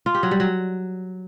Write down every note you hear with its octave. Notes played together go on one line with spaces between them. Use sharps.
F4
G4
F#3
G3
F#3